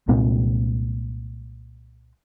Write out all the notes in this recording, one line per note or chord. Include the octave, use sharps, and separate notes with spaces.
C2 A#2 G#3 C4